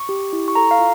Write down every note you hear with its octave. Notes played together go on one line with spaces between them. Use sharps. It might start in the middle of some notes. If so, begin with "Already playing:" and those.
Already playing: C#6
G4
E4
C#6
A4 A#5
F5
F4